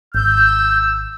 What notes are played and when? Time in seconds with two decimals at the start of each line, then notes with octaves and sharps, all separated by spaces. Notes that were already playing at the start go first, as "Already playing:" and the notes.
0.15 G#1 E6 G6